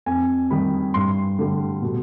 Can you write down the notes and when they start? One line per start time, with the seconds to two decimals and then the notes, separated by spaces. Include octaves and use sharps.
0.06 F2 G#5
0.51 D#3 G3 B5
0.94 G2 C6
1.39 D3 G3
1.82 B2